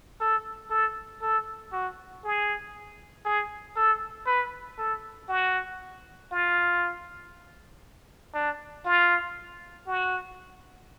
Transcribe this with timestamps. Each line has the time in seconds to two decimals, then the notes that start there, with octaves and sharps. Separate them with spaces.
0.21 A4
0.70 A4
1.22 A4
1.73 F#4
2.24 G#4
3.25 G#4
3.76 A4
4.27 B4
4.78 A4
5.29 F#4
6.32 F4
8.35 D4
8.86 F4
9.87 F#4